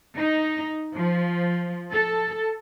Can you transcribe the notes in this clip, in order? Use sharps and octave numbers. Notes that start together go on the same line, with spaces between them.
D#4
F3
A4